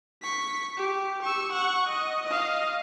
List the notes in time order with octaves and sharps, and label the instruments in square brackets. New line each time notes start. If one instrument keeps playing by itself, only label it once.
[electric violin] C#6 B6
G4
C#6 E6
F#5 C#6
D#5
D#5 F5